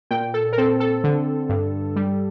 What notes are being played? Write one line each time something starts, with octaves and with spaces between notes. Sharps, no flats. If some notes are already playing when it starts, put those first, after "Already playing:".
A#2 G5
A4
A#4
C4 A4
A4
D3
G2
G3